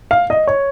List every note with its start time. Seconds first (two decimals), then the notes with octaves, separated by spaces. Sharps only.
0.11 F5
0.30 D#5
0.47 C#5